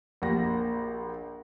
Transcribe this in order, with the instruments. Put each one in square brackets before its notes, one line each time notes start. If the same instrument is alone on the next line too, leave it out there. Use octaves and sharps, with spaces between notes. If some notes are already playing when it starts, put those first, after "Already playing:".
[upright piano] A#1 A#3 G4 F#5 A#6